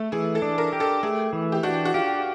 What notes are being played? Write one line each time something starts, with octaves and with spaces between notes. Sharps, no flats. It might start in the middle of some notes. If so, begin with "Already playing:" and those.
Already playing: A3 A4
E3 G#4
A4
D4
A#4
G4
A4
A3 G#4
E3
G4
D4 F#4
F#4
F4 G4